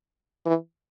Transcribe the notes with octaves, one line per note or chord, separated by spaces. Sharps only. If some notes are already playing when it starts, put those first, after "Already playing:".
E3